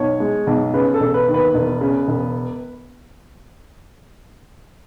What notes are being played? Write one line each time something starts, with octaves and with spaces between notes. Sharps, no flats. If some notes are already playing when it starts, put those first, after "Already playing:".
Already playing: B1 C#5
G#3
B1
C#3 B4
A4
E1
B4
D#2
B4
E1
C#3
E1